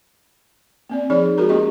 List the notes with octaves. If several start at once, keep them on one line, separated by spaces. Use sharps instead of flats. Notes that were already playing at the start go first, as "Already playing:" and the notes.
A#3 C4 D5
F3 D#4 G#4 C#5 D5 B5
G#3 F#4 G#4 A#4 A#5
A#3 C#4 E4 G4 D#5 C#6